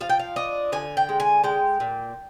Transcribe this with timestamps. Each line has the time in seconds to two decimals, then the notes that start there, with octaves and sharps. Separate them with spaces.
0.01 F3 F5
0.09 G5
0.19 F5
0.36 D4 D#5
0.72 D3 G#5
0.97 G5
1.09 G#3
1.20 G#5
1.44 G#3 G5
1.80 A#2